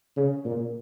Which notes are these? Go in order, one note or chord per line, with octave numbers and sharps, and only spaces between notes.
C#3
A#2